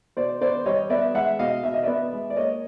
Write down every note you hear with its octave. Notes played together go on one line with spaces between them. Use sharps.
B2 C5 D5
B3 C5 D5
G3 C#5 D#5
B3 D5 E5
G#3 E5 F#5
B2 D#5 F5
B2 E5
D#5
B3 D5 E5
G#3
D5
A#3 C#5 D#5